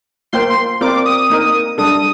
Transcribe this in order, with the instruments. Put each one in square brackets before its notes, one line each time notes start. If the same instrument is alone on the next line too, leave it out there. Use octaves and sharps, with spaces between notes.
[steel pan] A#3 F4 C5 G5 [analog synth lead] C6
[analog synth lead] C6
[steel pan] C4 F4 A#4 D5 [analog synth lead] D6
[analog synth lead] D#6
[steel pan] A#3 D#4 A#4
[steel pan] G3 D4 A4 [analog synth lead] D#6